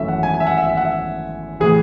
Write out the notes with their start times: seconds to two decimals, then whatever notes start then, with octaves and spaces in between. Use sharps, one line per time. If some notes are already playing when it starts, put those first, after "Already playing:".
Already playing: G#1 F#2 E3 A3 C#4 E5
0.08 F#5
0.23 G#5
0.34 G#5
0.40 E5
0.47 F#5
0.57 E5
0.70 E5
0.77 F#5
0.85 E5
1.60 A2 E3 G#4